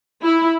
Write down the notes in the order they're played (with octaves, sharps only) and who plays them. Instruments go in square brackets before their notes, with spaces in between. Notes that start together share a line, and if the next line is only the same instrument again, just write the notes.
[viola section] E4